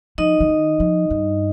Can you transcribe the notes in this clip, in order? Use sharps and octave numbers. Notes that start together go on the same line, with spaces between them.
F3 D#4 D#5
F3
D#3
F3
G2